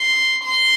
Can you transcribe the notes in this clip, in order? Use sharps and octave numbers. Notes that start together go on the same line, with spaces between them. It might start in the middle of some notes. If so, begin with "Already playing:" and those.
Already playing: C6
C6